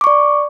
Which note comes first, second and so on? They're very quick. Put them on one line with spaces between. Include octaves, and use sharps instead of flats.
D6 C#6 D5